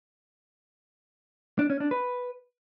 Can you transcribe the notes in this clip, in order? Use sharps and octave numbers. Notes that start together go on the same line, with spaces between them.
D4
C#4
D4
B4